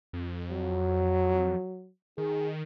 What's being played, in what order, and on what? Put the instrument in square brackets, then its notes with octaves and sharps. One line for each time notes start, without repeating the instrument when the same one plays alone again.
[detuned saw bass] F2
[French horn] F#3
[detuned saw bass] D#3 [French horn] G#4